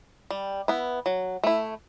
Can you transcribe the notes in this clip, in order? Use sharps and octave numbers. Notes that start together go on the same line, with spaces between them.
G3
B3 E4
F#3
A3 E4